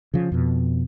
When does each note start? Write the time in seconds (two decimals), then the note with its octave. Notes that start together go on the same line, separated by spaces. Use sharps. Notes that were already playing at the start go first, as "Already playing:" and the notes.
0.14 C#3 F3
0.32 F2 B2